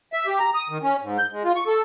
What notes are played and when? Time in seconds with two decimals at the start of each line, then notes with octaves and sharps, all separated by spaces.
0.13 E5
0.26 G4
0.39 A#5
0.54 D#6
0.70 D#3
0.83 C#4
1.01 G#2
1.18 G6
1.32 G#3
1.45 F4
1.56 C#6
1.67 A4